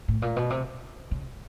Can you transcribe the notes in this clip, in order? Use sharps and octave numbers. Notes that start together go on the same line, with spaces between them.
A2
A#2
B2
C3
C#3